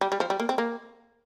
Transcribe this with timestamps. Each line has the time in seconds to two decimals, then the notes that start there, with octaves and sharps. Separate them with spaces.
0.01 G3
0.12 G3
0.20 F3
0.30 G3
0.40 A#3
0.49 C4
0.58 A#3